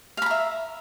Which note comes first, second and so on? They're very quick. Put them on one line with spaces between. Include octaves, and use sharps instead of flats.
F5 B5 A#5 E5